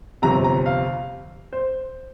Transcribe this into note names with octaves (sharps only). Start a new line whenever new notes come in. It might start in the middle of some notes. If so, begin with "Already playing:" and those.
G1 F2 C3 A#5
A#5
F5
C5